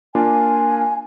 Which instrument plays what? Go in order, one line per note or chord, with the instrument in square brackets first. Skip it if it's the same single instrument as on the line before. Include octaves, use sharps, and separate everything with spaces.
[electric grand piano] A#3 D4 F4 [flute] G#5